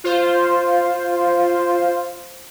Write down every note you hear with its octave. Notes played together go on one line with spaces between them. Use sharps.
F4 C5